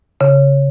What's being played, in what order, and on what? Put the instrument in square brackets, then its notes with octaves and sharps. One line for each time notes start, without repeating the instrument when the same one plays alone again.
[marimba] C#3